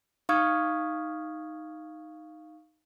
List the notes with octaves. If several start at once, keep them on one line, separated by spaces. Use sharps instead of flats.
D#4 F5 C#6 D#6 F6 G#6